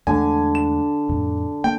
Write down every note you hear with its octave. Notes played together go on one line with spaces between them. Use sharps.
E2 D3 G#3 A3 G#5
E7
F2 A2
A#3 G5